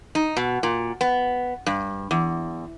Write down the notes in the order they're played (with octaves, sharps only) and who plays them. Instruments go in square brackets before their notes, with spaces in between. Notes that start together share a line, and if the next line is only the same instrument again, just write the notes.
[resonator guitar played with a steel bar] D#4
B2
A#2
B3
G2
E2